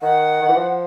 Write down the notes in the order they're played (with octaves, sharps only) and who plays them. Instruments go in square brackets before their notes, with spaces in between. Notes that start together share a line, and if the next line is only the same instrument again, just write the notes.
[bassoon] D#3 [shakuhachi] F#5
[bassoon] D#3
E3
F3